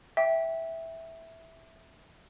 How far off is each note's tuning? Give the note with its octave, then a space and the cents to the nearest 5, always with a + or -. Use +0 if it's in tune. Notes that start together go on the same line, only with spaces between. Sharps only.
E5 -5 G5 +5